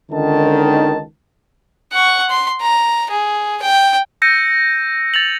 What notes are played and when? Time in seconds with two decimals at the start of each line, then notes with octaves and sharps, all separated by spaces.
0.11 C#2 D3 D#3 A5
1.92 F#5 C#6
2.30 C6
2.61 A#5
3.10 G#4
3.62 G5
4.22 E6 G6 A#6 C#7 D#7
5.14 A6 F7 F#7